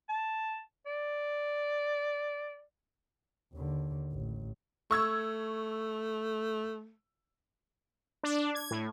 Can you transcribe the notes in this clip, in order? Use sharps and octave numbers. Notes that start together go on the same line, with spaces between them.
A5
D5
D#2 D3
A1
A3 C#6 E6 G#6
D4
G#6
A2